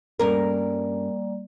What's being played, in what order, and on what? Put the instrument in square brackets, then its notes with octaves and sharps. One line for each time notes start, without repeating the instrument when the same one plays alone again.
[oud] G2 C#4 A#4 [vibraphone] G3 A#3 D5